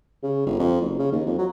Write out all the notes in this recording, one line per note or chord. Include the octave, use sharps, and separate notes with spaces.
C#3
G1
F2
F#1
C#3
D#2
F2
F#3